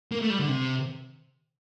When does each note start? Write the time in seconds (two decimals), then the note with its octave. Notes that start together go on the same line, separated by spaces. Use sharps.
0.12 A#3
0.22 A3
0.30 G3
0.39 D3
0.48 C3